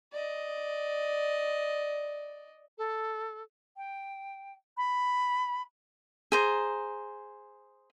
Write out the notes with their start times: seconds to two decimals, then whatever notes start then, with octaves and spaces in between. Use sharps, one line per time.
0.13 D5 D#5
2.78 A4
3.77 G5
4.77 B5
6.32 G#4 C5 A#5